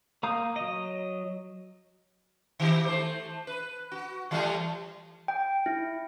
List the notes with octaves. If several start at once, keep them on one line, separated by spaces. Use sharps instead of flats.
A#3 F5 A#5 D#6 G6
F#3 D#5
D#3 G4
A3 C5
B4
F#4
E3 G3 A3
G5
E4